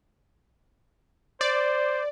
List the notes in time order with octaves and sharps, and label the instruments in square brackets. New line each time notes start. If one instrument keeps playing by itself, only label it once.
[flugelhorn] C5 [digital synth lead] D5